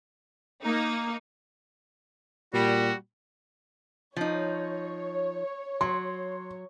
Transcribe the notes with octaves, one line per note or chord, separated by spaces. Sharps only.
A#3 D#4
A#2 G3 F#4
F3 D#4 C#5
F#3 C6